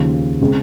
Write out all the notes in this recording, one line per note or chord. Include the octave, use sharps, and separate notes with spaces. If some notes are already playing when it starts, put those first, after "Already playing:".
Already playing: D#2 C#3 F3
C#3 G#3 C4